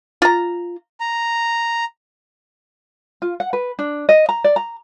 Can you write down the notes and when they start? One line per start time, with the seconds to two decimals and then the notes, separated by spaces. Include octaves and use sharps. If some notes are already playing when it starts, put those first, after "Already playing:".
0.22 F4 A#5
1.00 A#5
3.22 F4
3.40 F#5
3.53 B4
3.79 D4
4.09 D#5
4.29 A#5
4.44 D5
4.56 A#5